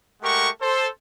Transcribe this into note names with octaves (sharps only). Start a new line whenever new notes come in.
G#3 A3 G4 A#4 F#5 C#6
A4 C5